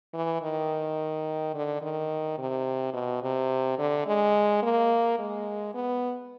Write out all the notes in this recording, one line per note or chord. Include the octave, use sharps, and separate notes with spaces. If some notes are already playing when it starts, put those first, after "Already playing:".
E3
D#3
D3
D#3
C3
B2
C3
D3
G#3
A#3
G#3
B3